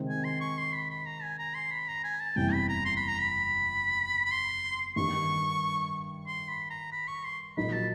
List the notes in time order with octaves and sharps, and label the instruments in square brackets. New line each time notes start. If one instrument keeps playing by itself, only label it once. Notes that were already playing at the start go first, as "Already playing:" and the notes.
Already playing: [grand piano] C3 D#3 G#3 C4
[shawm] G#5
C6
C#6
C6
B5
B5
A#5
G#5
A#5
C6
B5
A#5
G#5
A5
[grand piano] F#1 E2 C3 E3 G3 [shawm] G5
[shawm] B5
A#5
C6
B5
A#5
B5
B5
C6
[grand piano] G2 D#3 G3 [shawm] C#6
[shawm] C6
B5
A#5
B5
C#6
C6
[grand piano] A#1 A#2 F#3 A#3 D#4 [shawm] B5
[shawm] A5